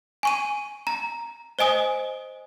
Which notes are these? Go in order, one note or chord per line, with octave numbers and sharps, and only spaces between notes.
G#5 C#6 D#7
A#5
C5 D#5 G#5 D#6